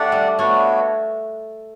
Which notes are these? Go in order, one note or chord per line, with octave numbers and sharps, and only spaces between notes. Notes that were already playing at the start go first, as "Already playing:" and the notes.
Already playing: A3 D4 G4 D5 F#5
G3
A3 B3 D4 F#4 C#5